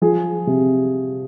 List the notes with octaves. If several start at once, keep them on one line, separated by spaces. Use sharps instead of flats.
F3 G#4
C3